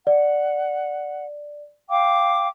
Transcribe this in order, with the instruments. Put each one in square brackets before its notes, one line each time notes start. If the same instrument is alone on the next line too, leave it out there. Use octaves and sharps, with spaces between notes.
[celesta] D5 [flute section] F#5
[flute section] F5 G5 D6